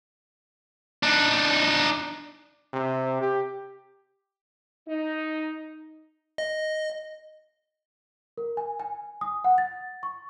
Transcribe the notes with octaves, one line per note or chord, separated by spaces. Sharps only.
D4 D#4
C3
G4
D#4
D#5
A#4
G#5
G#5
D#6
F#5
A6
C#6